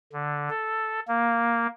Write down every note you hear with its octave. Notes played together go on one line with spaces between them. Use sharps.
D3
A4
A#3